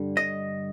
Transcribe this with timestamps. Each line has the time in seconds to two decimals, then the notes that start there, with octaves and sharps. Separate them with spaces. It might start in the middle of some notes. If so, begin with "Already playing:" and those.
Already playing: G2 D3 G3
0.17 D#5